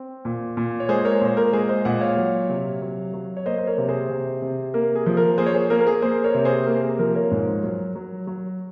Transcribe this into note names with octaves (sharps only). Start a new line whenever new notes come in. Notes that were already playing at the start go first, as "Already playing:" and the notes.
Already playing: C4
A#2
A#2
C#5
G#3 G#4 C5
A#4 C#5
A#2 C5
A#4
G#3 G#4 C5
C5 D#5
A#2 D#5 F#5
C#5 F5
F#3
C3
F#3
F#3
C#5
A#3 C5 D#5
C5
A#4 C#5
C3
G#4 C5
C3
C3
A#3 A#4
G#4
F3
A#4
A#3 G#4 C5
C#5
G#4 C5
A#3 A#4
A#4
G#4
A#3 G#4 C5
A#4 C#5
C3
G#4 C5
A#3 A#4
G#4
F3 A#4
A#4 C#5
G#2
F#3
F#3
F#3